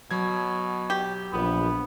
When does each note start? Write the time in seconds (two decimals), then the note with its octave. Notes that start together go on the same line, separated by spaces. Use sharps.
0.11 B2 F#3 G#6
0.90 G4
1.32 A#1 B3